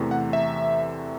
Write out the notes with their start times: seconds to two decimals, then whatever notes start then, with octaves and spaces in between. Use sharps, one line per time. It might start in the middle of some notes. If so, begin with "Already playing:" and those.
Already playing: E2 C3 E3 A3
0.11 F#5
0.33 E5